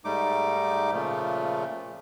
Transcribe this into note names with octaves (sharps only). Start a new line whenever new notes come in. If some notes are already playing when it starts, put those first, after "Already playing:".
G#2 G3 A3 D#4 D6
A#2 C#3 F3 A3